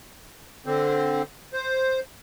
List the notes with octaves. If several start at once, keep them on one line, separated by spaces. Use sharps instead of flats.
D3 C4
C5